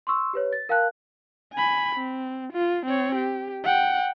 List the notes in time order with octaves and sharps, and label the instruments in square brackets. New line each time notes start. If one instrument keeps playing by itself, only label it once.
[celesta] C6 C#6 E6
G4 B4 C#5
A6
A#4 F5 G5 A5 F#6
[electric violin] G#5 B5
C4
F4
C4 C#5
G4
F#5 G5